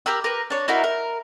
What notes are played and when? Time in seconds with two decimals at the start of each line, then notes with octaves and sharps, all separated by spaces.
0.06 G4 A#4 B5 E6
0.24 A#4 B4
0.50 D4 C#5
0.68 D#4 E4 F#4 A#4
0.84 A#4